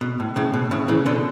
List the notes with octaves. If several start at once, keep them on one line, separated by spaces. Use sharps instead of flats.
B2
A2
A2 C#3
B2
A2 C#3
C#3 E3
B2 D3